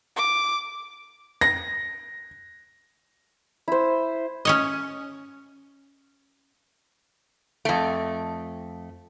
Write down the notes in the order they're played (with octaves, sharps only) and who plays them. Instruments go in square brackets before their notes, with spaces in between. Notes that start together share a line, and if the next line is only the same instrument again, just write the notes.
[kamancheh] D6
[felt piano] A#6
[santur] E4 C5
[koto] C#4 C#5 D#5
[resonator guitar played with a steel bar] F2 A3